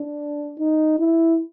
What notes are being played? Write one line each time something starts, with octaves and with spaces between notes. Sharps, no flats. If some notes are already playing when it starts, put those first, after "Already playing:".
Already playing: D4
D#4
E4